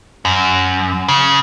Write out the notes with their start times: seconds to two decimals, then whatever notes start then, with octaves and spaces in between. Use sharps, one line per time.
0.25 F#2
1.08 C#3